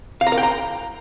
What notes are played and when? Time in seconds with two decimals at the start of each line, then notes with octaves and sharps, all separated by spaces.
0.21 F5
0.27 A#5
0.32 A#4
0.38 G5
0.43 A#5